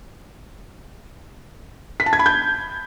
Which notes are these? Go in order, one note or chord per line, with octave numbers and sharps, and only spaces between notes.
B6
A5
G#6
B5
G6